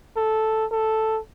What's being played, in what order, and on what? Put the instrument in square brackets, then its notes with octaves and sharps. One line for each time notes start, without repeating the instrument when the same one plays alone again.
[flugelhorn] A4
A4